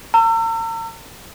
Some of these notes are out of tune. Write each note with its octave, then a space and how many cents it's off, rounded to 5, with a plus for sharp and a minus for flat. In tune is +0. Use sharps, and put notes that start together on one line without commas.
A#5 -40 E6 +30